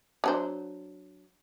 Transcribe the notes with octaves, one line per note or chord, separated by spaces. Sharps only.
F#3 D4 C5